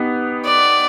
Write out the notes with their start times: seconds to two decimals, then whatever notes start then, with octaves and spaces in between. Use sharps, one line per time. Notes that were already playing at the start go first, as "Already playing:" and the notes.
Already playing: B3 D#4 G4
0.45 D5